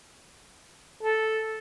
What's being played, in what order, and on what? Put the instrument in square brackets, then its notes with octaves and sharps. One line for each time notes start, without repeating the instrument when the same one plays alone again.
[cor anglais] A4